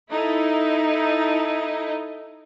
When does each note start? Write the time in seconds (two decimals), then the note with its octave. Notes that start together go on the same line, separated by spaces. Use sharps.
0.11 D#4 E4 A4